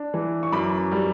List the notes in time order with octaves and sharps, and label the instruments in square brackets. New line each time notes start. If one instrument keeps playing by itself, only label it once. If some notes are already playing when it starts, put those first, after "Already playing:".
Already playing: [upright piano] D4
E3
C#6
F#2 B5 D6
G3